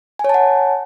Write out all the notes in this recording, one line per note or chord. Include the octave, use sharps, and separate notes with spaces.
C#5 F#5 G#5 A5